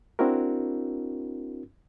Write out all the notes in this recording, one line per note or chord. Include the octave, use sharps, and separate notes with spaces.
C4 D4 E4 F#4 A#4